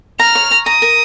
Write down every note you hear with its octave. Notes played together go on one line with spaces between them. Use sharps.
A#5 F6
C#5
A#5
A#5 D#6
A#4